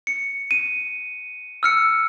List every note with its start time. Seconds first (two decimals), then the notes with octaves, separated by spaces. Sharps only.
0.07 C#7
0.51 D#7
1.63 E6 F6 C#7